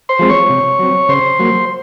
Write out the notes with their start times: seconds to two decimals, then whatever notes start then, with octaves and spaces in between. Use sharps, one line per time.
0.09 C5 C6
0.19 F3 G#3 C4
0.29 C#5 C#6
0.49 C3
0.79 F#3 C4
1.09 C#3 C5 C6
1.39 F#3 A#3